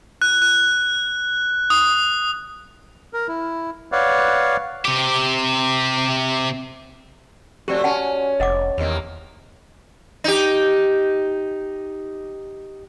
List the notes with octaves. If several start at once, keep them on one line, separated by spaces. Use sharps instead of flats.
F#6
F#6
D#6
A#4
E4
B4 C#5 D5 F5 F#5
C3 G4
F2 A3 C4 F#4 G4 D5
C#4 F#5 A5 C#6
F1 D#5 F#5 D6
E2 C3 D#3 A#3
D#4 G4